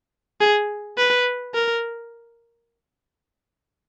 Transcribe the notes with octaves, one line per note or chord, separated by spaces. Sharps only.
G#4
B4
A#4